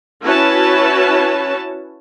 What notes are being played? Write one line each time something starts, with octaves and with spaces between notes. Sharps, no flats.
C#4 E4 F#4 B4 C#5 A5